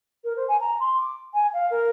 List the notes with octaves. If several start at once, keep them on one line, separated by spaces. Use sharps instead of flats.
A#4
C5
G#5
A#5
C6
D6
G#5
F5
A#4